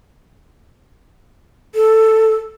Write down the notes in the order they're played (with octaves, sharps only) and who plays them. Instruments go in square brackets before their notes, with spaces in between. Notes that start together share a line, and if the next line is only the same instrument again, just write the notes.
[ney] A4